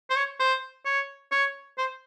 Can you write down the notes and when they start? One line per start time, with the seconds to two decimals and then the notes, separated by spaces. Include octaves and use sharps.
0.10 C5
0.16 C#5
0.40 C5
0.86 C#5
1.32 C#5
1.78 C5